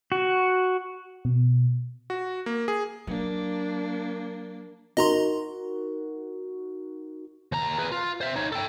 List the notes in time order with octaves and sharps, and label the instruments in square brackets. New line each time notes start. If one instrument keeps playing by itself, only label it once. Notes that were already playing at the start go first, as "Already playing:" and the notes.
[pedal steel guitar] F#4
[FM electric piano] B2
[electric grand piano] F#4
A#3
G#4
[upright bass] F#3 [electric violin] A#3 D4
[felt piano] D#4 F#4 A#4 [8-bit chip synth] D#5 A#5 C6
[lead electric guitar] D#2 A#5
G#4 B4
F4
C5 E5
D#4 C#5
A4 G5